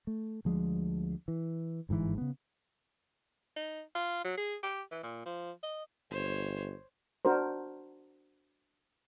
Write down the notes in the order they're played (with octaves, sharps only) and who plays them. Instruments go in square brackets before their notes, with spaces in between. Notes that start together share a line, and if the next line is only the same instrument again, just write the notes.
[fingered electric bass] A3
D2 F3 G#3 D4
E3
G1 G#2 D3 E3
C#3 B3
[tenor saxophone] D#4
F4
F#3
G#4
G4
E3
A#2
F3
D#5
[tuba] G1 [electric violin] C5 C#5
[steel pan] D4 F#4 A#4 C5